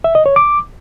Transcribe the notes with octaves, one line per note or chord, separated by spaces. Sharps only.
E5
D#5
C#5
D6